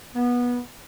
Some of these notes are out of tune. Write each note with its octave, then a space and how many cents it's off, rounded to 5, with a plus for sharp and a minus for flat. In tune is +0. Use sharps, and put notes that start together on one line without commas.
B3 -20